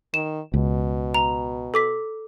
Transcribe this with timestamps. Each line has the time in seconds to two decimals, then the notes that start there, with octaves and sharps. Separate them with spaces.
0.14 D#3 E7
0.54 C#2 B2
1.14 A#5 F7
1.74 A4 D6 B6